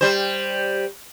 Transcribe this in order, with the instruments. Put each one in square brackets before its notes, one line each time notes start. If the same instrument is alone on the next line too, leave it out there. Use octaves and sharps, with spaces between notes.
[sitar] G3 C5